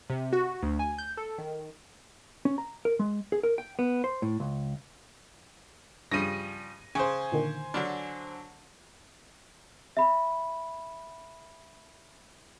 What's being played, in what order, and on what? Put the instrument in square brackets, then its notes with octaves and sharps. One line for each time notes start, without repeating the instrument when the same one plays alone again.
[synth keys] C3
F#4
D2
G#5
G6
A4
D#3
[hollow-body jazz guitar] C#4
A#5
A#4
G#3
G#4
A#4
G5
B3
C5
A2
C#2
[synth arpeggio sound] G2 [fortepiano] C#3 F3 G3 [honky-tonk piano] A#6 D#7
[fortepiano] C#3 [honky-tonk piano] C5 G#5
[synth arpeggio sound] A#2 D3 D#3
[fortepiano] D3 F#3 D4 [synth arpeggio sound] B5 F6
[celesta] E5 B5